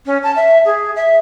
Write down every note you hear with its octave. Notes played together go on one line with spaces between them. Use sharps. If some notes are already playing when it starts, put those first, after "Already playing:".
C#4
A5
E5
G#4
E5